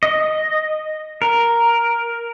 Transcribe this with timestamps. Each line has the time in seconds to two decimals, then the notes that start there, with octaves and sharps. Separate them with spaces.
0.03 D#5
1.22 A#4